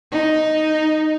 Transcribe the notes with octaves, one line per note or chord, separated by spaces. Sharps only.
D#4